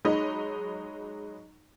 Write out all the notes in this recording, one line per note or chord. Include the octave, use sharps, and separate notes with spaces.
F#3 G#3 D#4 D#5 B5